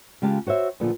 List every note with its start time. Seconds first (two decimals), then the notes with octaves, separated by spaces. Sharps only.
0.22 C#3 G#3 F4 G4 A5
0.47 F#4 C5 C#5 E5
0.80 A#2 D3 F3 B3 G#4